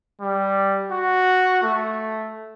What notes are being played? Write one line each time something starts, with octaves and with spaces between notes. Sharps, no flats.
G3
F#4
A3